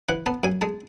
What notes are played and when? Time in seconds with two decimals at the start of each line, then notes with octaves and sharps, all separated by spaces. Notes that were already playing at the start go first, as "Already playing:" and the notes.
0.09 E3 F#5
0.26 B3 A5
0.43 F#2 G#5
0.61 G#3 A5